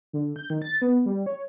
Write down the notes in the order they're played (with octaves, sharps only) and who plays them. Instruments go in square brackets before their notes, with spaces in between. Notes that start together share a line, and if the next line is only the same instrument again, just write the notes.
[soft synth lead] D3
G6
D#3
A6
B3
G3
C#5